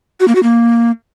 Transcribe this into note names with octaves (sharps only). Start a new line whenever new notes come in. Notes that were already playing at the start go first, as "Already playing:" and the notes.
F#4
A#3
F#4
A#3